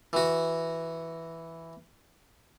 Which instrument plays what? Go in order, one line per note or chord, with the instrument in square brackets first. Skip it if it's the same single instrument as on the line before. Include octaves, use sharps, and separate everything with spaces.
[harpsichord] E3 F#4